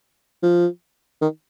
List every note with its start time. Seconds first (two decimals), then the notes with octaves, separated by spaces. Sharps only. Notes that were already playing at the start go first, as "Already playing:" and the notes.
0.42 F3
1.21 D#3